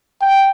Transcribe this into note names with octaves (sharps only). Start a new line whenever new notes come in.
G5